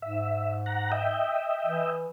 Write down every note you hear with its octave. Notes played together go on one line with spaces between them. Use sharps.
G#2 E5
F#5 A#5
D#5 E5 G5
E3